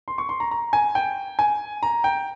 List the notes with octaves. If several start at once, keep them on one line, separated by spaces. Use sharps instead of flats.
C6
C#6
C6
A#5
A#5
G#5
G5
G#5
A#5
G5